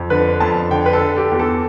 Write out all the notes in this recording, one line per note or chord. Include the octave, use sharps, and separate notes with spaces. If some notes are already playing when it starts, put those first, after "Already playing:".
Already playing: F2
D3 B4
F2 A5
D3 G5
B4
A4
D3
G4
E2 G4
A4